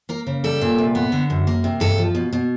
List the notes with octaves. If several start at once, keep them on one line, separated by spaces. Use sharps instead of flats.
A#3 A#4
C#3
G3 A4
A#2
C3
B3
D3
F#2
A#3
C3
G2 A4
F3
B2
B2